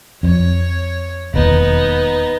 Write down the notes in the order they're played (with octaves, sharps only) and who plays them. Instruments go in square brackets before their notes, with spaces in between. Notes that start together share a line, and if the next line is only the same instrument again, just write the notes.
[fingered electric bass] F2 [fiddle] C#5
[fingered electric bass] E1 D#2 [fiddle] B3 D#4